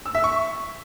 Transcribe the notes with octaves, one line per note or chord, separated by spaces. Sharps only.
E6
E5
C#6